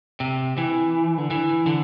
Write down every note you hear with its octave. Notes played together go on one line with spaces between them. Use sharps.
C3
E3
D3
E3
D3